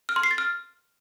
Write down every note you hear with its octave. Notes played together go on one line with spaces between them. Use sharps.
F6
C6
C7
A6
F6